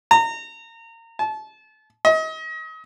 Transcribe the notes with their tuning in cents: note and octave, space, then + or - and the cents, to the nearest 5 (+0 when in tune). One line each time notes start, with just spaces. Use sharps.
A#5 -30
A5 -30
D#5 +35